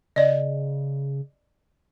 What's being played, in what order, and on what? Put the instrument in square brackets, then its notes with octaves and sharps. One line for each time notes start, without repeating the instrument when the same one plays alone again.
[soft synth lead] C#3 [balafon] D5 D#5